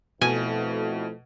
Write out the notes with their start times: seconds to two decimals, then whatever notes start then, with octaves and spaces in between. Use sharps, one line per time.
0.21 F2 B2 A3 E4 G#5